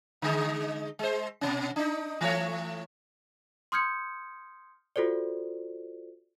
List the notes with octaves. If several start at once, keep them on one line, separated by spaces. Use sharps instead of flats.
D3 G#3 D#4
G#3 C5
B2 D#3 C#4
D4 D#4
E3 A3 C#5
C6 D#6 F6 G6 G#6 C#7
F4 F#4 A4 C5 D5